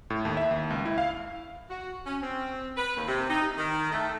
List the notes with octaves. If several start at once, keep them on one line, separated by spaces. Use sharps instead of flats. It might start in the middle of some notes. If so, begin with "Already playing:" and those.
A2
D#2
E5
D#2
C#2
E4
F5
F#4
C#4
C4
B4
D#2
C3
D#4
D#3
A3